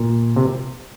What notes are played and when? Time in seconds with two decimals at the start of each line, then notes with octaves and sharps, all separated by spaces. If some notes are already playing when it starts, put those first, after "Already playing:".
Already playing: A#2
0.36 C3